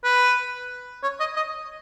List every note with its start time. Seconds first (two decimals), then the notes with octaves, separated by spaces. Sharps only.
0.04 B4
1.03 C#5
1.20 D#5
1.36 D#5